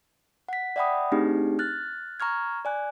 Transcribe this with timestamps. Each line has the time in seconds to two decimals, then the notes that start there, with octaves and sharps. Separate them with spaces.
0.49 F#5 B6
0.76 D5 E5 F#5 G5 B5 D#6
1.12 A3 C4 D4 D#4 G4 G#4
1.59 F6 F#6 A6
2.20 A#5 C#6 F6 G#6
2.65 D5 G#5 F#6